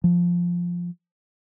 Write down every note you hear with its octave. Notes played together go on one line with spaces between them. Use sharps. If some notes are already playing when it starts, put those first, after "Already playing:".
F3